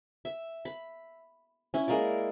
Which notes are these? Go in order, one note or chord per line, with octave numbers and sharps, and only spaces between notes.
E5
B5
C#4 E4
G#3 A#3 A#4 D5